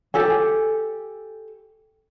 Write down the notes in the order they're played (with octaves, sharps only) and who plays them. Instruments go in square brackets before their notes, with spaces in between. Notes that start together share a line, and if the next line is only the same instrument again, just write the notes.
[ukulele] G4 A4 G#5